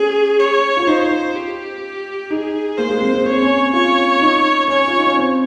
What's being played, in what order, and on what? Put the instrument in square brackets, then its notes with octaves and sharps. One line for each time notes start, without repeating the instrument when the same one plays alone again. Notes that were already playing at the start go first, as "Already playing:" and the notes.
Already playing: [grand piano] C#4 [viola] G#4
[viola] C#5
[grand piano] F4
[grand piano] D#4 [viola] C5
[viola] G4
[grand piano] D#4 [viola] G#4
[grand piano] A#3 [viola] C5
[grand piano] G#3
C4
C4
[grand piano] C4 [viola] C#5
[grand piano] C#4
[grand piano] F4 [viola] C#5
[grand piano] D#4
[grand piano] C#4 [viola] C#5
[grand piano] F4
D#4
C#4
C4